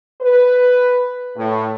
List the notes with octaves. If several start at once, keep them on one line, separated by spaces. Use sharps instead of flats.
B4
A2